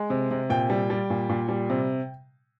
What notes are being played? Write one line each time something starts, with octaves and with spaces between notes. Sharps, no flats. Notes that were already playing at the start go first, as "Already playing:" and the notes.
Already playing: G#3
C3
C3
A#2 G5
G3
G3
A#2
A#2
G3
C3